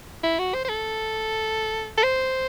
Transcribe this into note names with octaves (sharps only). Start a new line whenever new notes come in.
E4
F#4
C5
C5
A4
A4
C5